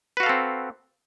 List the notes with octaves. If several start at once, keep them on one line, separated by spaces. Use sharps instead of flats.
C4 F#4 A4 B4 F5